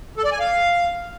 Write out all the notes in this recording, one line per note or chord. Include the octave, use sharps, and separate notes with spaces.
A4
D5
G#5
F5